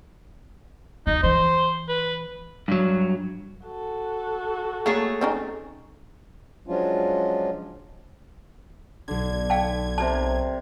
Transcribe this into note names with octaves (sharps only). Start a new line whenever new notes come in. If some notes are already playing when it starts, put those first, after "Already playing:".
F#1 D#2 D#4
E3 C5
B4
G2 F#3
F#4 A4
A3 A#3 G#4 C#5
C4 C#4 D#4
F3 F#3 G#3 C#4 D4 F4
B1 D3 G#6
F5 G5 A5
C3 A#4 A5